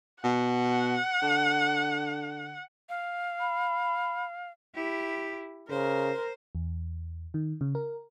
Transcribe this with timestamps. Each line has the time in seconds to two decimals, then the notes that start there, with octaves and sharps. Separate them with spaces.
0.24 B2 F#5
1.22 D3
2.89 F5
3.40 B5
4.75 E4 G4
5.70 C#3 A#4 C5
6.55 E2
7.34 D#3
7.61 C#3
7.75 A#4